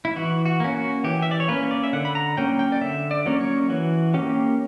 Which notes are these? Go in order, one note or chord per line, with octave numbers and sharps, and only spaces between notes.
E4
E3 F#4
F#4
A#3 C#4
F#4
E3 G4
E5
D5
C#5
A#3 C#4 B4
D5
E5
D3 F#5
B5
A#5
F#3 A#3 C#4 G5
G5
D5
D3 E5
D5
F#3 A#3 C#4
C#5
E3 F#4
A#3 C#4 G4